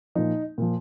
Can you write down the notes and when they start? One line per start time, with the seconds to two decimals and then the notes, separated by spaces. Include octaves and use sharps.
0.15 A#2 F3 D#4
0.58 A#2 F3